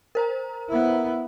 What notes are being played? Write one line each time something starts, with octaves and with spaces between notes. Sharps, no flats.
A#4 C5 A#5
B3 E4